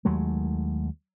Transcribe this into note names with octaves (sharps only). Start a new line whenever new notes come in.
D#2 F#3 G#3 A3